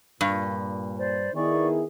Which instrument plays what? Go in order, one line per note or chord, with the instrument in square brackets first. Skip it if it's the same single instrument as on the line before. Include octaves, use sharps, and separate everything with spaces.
[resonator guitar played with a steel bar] G2 [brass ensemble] A#2
[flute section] C5 D5
[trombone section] D#3 G#4 [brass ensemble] B3 E4 [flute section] D5 C#6